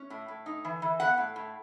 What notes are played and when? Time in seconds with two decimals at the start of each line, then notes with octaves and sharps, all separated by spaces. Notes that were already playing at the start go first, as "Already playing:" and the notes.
Already playing: C#4
0.10 A2
0.28 A2
0.46 D#4
0.65 E3
0.82 E3
1.00 B3 F#5
1.18 A2
1.36 A2